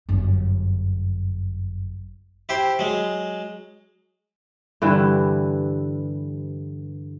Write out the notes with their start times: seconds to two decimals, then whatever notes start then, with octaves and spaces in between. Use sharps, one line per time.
0.09 G1 F#2
2.49 E4 G4 C5
2.79 F#3 G#3
4.82 G2 D3 E3 G3